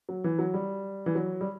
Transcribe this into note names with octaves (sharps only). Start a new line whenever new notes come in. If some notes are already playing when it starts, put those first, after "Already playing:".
F#3
E3
F#3
G3
E3
F#3
G3